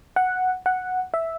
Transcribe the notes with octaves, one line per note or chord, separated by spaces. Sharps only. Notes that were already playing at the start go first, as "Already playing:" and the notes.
F#5
F#5
E5